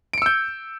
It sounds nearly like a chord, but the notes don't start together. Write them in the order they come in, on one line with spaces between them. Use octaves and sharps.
D7 C#7 E6 G6